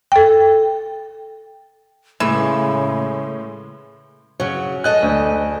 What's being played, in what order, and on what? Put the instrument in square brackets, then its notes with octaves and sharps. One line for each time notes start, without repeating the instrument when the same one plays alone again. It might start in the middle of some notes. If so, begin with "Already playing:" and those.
[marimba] A4 G5
[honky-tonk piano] A2 G#3 G#6 [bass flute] C#3 [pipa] E3
[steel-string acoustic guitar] C#3 F#3 [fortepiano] C#5
[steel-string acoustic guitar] A4 D#5 G#5 [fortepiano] F#6
[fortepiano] D2